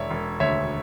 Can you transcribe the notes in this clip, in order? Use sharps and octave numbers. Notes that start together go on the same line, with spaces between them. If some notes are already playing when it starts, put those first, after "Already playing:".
Already playing: E1 C#5 D5 E5
E1
D2 C#5 E5